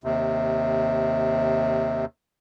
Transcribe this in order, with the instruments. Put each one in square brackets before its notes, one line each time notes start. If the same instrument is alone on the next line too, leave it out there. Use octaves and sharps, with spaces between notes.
[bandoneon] D#2 C3